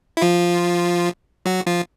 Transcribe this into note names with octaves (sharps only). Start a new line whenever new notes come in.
E4
F3 F4
F#3 F#4
F3 F4